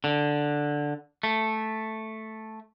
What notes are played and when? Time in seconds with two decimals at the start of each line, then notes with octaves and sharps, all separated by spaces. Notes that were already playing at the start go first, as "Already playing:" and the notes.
0.04 D3
1.23 A3